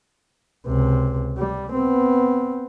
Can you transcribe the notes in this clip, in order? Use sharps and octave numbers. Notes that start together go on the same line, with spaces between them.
C#2 C3
G3
B3 C4